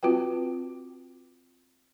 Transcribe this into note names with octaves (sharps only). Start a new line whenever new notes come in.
C4 F4 F#4 B4 G5